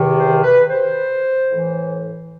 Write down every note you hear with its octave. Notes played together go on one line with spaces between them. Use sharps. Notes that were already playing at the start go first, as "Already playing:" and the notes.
Already playing: E2 C3 D#3
C5
B4
C5
A2 E3